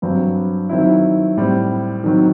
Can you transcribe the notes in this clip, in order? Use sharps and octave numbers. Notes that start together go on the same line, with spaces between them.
G2 F#3 C4
D#3 F#3 C4 E4
A2 G3 C4
D#3 F#3 C4